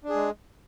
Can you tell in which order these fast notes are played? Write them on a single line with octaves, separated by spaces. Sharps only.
D4 G#4 G#3